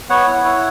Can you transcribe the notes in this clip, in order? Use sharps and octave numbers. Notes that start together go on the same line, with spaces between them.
B3 C#5 F#5
E4
E4